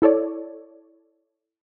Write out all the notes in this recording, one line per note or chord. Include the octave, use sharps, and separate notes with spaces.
E4 A4 C#5 D5